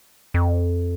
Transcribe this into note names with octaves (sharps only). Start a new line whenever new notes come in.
F2